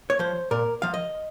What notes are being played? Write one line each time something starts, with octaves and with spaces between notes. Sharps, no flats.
C#5
F3 C5
A#2 A#4
F3 F5
D#5